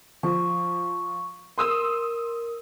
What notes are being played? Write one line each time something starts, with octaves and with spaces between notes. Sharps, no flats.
F3 C#6
A#4 C6 D#6 E6